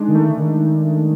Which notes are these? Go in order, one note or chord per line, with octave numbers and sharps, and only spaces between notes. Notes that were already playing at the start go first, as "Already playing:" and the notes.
Already playing: G#3 D4 D#4
D#3
A3
D#3